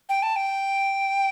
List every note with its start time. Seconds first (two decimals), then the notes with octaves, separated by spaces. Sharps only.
0.09 G5
0.22 A5
0.36 G5